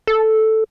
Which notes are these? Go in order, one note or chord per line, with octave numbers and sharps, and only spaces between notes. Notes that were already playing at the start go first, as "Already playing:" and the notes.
A4